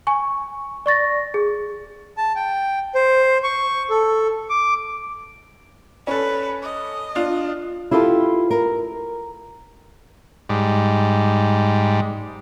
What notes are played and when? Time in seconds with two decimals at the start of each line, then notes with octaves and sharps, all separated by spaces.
0.07 G#5 C#6
0.86 D5 C#6 A6 A#6
1.34 G#4
2.17 A5
2.36 G5
2.95 C5
3.44 C#6
3.90 A4
4.50 D6
6.07 C#4 A4 B4
6.63 D#5
7.15 D4 F4
7.91 E4 F4 G4 A4 B4
8.50 A#4
10.49 G#2 G3